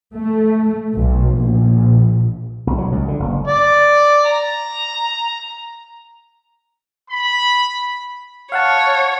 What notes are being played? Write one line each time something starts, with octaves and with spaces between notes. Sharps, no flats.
A3
B1
A#1
B1
F#3
C#2
D3
F#1
D5
A#5
B5
C#5 F5 F#5 A5